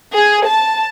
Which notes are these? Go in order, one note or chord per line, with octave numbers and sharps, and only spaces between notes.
G#4
A5